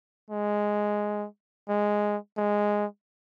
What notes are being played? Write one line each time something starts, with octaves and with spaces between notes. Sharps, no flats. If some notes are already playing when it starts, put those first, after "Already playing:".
G#3
G#3
G#3